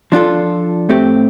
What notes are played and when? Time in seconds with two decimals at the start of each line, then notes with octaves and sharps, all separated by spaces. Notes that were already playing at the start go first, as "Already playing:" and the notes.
0.12 F3 D4 F4 A4
0.89 A2 A3 C4 G4